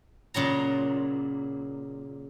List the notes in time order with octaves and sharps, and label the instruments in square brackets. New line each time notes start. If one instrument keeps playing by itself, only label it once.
[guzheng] A#2 C#3 F#3 A#5